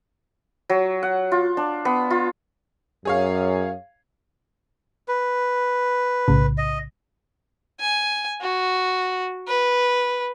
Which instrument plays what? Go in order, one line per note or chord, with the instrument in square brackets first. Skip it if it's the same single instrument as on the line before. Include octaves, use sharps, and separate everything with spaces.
[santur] F#3
F#5
F4
D4
B3
F4
[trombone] F#2 [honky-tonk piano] G#4 C#5 F5
[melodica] B4
[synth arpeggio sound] B1 A2 C#3
[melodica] D#5
[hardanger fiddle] G#5
F#4
B4